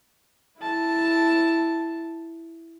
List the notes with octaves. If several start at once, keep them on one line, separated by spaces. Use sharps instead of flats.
E4 A5